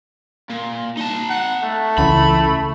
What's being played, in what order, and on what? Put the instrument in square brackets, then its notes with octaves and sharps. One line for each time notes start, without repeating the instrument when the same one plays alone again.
[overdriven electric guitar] A#2
D#4 A5
[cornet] F#5
A3
[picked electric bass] C#2 C#3 E3 [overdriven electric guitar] B5